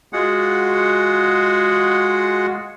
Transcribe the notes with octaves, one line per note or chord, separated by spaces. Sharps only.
G#3 F4 F#4 G#4 F#5